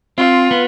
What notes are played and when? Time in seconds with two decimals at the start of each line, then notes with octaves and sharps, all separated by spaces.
0.18 C4 F4
0.51 B3